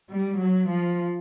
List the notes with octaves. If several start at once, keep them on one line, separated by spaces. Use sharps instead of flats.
G3
F#3
F3